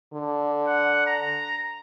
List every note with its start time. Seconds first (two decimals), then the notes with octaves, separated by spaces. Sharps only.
0.13 D3
0.67 F#5
1.07 A#5